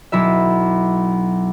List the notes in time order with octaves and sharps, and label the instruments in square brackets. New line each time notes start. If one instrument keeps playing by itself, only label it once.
[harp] B1 E4 E5